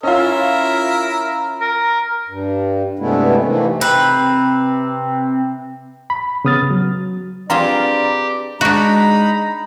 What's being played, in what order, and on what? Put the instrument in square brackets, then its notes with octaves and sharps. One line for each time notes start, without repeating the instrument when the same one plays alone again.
[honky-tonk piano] C#4 F4 [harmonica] E4 A#4 E5
[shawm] A#4
[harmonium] G2
G2 C3 G#3 A3 B3 E4
C3 D#3 E3 A3 A#3
[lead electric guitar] C3 C4 [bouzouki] B4
[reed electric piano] B5
C#3 B3 D#6 F6 A6
F#3
[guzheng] C4 F4 G#4 [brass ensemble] D4 B4 D5 [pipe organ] G4 [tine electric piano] A#5
[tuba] G#3 [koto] D4 F#4 [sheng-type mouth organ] D#4 B5 [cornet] A#5